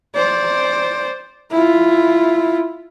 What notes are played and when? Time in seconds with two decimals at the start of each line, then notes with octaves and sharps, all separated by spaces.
0.15 C5 D5
1.51 E4 F4